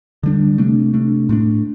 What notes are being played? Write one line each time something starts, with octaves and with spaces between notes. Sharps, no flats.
D3 G3 D4
C3 A3 D4
C3 A3 D4
A2 A3 D4